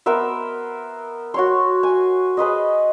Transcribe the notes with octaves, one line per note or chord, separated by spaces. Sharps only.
B3 A#4 C5 E5
F#4 C#5 C6
G#5
G#4 B4 C5 D#5